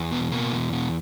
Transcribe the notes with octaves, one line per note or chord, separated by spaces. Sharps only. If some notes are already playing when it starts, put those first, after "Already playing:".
Already playing: E2
B2 B3
B2 A#3
E2
B2